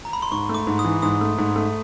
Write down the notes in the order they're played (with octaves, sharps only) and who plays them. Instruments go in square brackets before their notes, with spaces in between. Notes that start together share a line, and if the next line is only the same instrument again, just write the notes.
[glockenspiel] A#5
B5
C6
[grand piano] G#2 [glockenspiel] C#6
[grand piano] A3
[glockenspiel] D6
[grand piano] G#2
[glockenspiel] D#6
[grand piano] E3
[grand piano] G#2 [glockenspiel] D#6
[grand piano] A3
G#2
A3